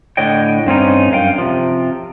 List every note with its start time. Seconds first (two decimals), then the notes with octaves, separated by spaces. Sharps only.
0.17 A2 D3 C#5 D#5 G5
0.67 G2 C4 C#4 D#4
1.12 F#2 F5 G5
1.38 C3 F3